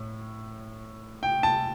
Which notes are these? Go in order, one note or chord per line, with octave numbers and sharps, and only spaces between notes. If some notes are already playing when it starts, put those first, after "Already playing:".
Already playing: A2
G5
A5